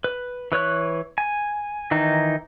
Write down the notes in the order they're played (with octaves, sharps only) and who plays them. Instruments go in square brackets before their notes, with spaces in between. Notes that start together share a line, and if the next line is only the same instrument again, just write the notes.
[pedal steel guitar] B4
E3 B4 C#5 F#6
G#5
D#3 E3 D#4